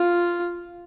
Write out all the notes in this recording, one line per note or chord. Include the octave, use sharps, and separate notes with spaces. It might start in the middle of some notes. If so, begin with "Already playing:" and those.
Already playing: F4